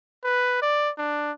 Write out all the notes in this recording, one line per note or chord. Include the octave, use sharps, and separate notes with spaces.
B4
D5
D4